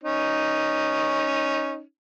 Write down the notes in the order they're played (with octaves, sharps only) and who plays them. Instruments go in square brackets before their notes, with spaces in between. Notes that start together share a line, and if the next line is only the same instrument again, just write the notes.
[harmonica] C#4 D#4